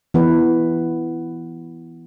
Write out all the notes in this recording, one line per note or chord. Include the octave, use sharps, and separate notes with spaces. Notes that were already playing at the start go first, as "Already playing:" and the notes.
E3 B3 B4